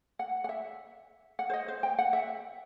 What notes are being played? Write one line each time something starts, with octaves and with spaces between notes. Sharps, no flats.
F#5
F#5
E5
F#5
C5
D#5
C5
G5
F#5
E5